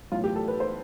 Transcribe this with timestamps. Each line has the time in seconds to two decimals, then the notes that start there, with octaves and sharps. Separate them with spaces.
0.12 B1 A2 E3 F4
0.24 G4
0.36 A4
0.48 B4
0.60 C5